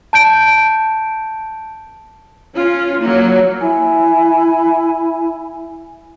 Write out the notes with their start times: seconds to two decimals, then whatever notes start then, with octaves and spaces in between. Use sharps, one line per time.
0.13 A5 G6 D7
2.55 C#4 F4
3.00 F#3 A#3
3.61 E4 G#5